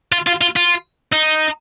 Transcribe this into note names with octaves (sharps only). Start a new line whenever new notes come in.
F4
F4
F4
F4
D#4